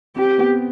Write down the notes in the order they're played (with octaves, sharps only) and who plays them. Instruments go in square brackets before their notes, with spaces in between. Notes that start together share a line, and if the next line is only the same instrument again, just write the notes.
[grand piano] C4 [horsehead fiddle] G4
[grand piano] B3